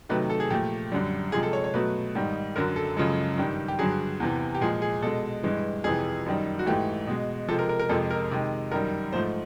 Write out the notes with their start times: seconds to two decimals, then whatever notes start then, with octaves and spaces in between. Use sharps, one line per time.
0.09 C3 D#3 F#3 A3 B4
0.30 A4
0.40 G#4
0.50 A#2 F3 A3 G4
0.92 F#2 D3 G3
1.32 C3 F3 G#3 G#4
1.43 A4
1.53 C#5
1.64 C#5
1.74 B2 F#3 A3 B4
2.15 G#2 D#3 G3
2.56 F#2 D3 F#3 A#4
2.76 A4
2.97 F#2 C#3 F3 G#3 A4
3.38 G2 D#3 G3
3.68 G4
3.79 G2 D3 F#3 G#4
4.20 E2 C3 E3
4.55 G4
4.61 A#2 F3 G#3 G#4
4.82 G#4
5.02 B2 G#3 A4
5.43 G2 E3 G#3
5.84 F2 C3 E3 G#4
6.26 F#2 D#3 G3
6.59 F#4
6.66 G#2 E3 A3 G4
7.07 B2 G#3
7.48 C3 F3 G#3 A4
7.59 A#4
7.69 A#4
7.79 A#4
7.89 F2 C3 F3 G#3 A4
8.11 A#4
8.31 C3 D#3 G#3
8.72 F#2 D#3 G3 A#4
9.13 G#2 F3 A3 C5